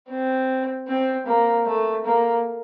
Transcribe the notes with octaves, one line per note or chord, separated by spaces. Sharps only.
C4
C4
A#3
A3
A#3